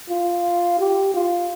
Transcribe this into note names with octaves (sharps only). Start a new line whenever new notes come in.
F4
G4
F4